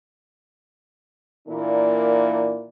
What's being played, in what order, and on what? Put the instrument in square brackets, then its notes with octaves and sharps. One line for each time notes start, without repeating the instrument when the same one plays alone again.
[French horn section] A#2 E3 A#3 D4 A#4 D5